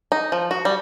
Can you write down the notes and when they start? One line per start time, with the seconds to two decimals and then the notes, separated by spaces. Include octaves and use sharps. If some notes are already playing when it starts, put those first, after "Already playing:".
0.12 D#4
0.32 F3
0.51 F#4
0.65 G3